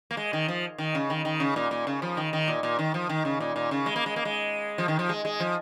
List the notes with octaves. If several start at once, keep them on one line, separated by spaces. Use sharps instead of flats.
A#3
G#3
D#3
F3
D#3
C#3
D#3
D#3
C#3
A#2
A#2
C#3
F3
D#3
D#3
A#2
A#2
D#3
F3
D#3
C#3
A#2
A#2
C#3
G#3
A#3
G#3
A#3
G#3
F3
D#3
F3
G#3
G#3
F3